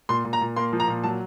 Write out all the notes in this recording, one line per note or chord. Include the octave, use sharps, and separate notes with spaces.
A#2 C6
A#2
A#5
A#2
A#3 C6
F3
A#5
A#2
F#3 A5